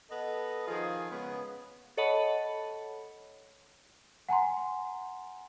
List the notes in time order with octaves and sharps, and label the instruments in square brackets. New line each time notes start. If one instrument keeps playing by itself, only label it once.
[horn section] B3 A4 D#5
D#3 F3 F4 G#4
C#3 G#3 B3
[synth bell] A4 C#5 D#5 F#5 A5 B5
[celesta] F#5 G#5 A#5 C6